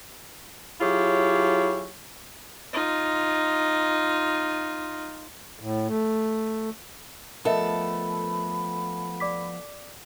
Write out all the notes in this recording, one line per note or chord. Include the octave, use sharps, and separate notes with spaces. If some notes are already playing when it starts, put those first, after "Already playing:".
F#3 E4 F4 G4 G#4 C#5
D#4 F4
A2
A3
F3 A3 B3 A4 A#4 D#5 E5 B5
D5 D6 B6